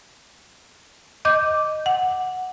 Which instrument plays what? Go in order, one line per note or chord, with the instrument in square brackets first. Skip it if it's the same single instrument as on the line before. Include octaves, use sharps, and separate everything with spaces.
[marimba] D#5 D6 G6
F#5